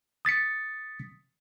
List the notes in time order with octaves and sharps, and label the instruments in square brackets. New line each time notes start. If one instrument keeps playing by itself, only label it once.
[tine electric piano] D#6 A6 B6 C#7